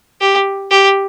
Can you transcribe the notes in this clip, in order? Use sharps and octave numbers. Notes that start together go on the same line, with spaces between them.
G4
G4